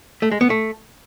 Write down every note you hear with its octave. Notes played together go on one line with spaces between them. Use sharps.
A3
G#3
B3
A3